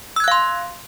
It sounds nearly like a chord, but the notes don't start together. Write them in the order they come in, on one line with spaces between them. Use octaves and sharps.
E6 G#6 F#6 F5 C6